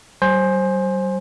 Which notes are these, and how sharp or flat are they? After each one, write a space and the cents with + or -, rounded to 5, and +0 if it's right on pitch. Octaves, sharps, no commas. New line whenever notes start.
G3 -45 C5 +15 G#5 +0